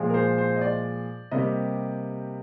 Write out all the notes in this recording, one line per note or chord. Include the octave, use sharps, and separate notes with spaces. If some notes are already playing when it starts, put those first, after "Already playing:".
Already playing: A#2 F3 G#3
A#4
C5
C5
D#5
D5
C3 G3 A#3 D#5